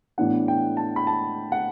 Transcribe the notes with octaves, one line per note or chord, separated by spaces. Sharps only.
A2 E3 B3 D4 F#5
G5
A5
B5
A5
F#5